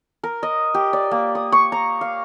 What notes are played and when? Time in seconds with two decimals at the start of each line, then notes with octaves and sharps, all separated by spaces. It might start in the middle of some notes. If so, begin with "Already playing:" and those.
0.24 A#4
0.43 D#5
0.74 G4
0.93 D5
1.11 A#3
1.35 D#6
1.52 C#6
1.72 A#5
2.01 F5